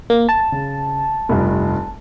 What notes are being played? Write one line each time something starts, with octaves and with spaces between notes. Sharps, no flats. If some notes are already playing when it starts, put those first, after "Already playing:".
A#3
A5
C#3
F1 G2 F4